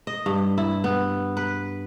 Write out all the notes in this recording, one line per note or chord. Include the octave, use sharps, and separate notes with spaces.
D#5
G2
E4
B3
B4